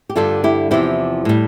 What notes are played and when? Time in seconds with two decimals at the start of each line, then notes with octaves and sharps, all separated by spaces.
0.09 G4
0.15 G2 D3 G3 F4 A4
0.44 E4 G4
0.71 E2 C3 F3 E4 G4
1.25 A2 G3